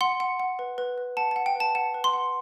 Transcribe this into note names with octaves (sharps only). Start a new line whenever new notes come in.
F#5 C6
F#5
F#5
B4
B4
B4
F#5 A5
F#5 A5
G5
B4 A5
F#5 A5
B4
C6
F#5